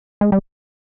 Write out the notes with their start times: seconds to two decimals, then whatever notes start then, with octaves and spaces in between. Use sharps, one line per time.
0.21 G#3
0.32 G3